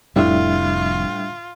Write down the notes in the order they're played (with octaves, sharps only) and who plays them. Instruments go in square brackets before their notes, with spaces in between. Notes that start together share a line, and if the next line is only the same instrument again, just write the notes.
[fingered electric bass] F1 F2 C4 [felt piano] A2 [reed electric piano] G3 D4 E5 [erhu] F4